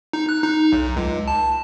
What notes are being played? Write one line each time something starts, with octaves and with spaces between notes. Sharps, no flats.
D#4
F#6
D#4
B1
C#2
A5